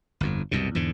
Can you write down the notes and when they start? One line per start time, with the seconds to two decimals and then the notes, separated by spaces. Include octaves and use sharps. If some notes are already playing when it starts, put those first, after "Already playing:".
0.21 G1 F2
0.51 C2 F#2 B2
0.75 E2 G#2 D3